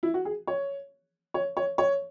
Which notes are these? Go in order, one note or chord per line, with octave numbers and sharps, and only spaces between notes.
E4
F#4
G#4
C#5
C#5
C#5
C#5